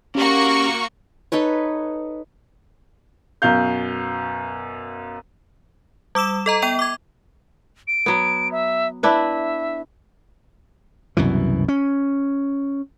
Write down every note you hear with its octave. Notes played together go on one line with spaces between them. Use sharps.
A#3 C#4 F#4 G4 C#6
D#4 A4 B4 C#5
F#2 B2 F5 G6
G3 D6 E6 E7
A4 D#5 A#5
B3 G5 D#7 F7
D6 G#6
D7
F#3 B3
E5
D4 E4 B4 E5
C2 F#2 B2 E3
C#4